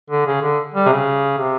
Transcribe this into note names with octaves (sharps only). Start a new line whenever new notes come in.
D3
C#3
D3
G3
C3
C#3
C3